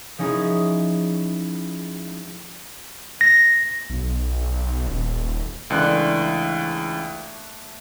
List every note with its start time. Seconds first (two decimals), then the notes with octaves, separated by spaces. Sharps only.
0.18 F3 G#3 C#4 D#4 E4 G#4
3.21 A#6
3.90 B1
4.88 D#1
5.70 C#2 E3 A3 D4 C6 F#6